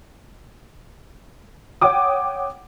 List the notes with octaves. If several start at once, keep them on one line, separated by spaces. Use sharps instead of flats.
C#5 F#5 G5 D6 D#6